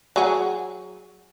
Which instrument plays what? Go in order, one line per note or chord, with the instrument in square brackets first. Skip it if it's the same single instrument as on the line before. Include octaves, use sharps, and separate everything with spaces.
[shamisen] F#3 G#4 F#5